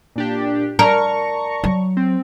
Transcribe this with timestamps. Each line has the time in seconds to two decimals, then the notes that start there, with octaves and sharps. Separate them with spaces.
0.16 A#2 D4 G4
0.79 A#4 D5 A5 A#5 C#6
1.64 F#3
1.97 C4